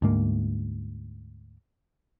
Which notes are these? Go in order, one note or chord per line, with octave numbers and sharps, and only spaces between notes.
D2 G#2 A#3